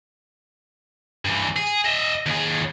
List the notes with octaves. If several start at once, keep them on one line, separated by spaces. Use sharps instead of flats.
G2 E3
G#4
D#5 E5
D#2 G#4